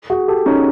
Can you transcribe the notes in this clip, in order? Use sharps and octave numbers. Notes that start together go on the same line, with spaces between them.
F#4 G#4
G4 A4
C#4 D#4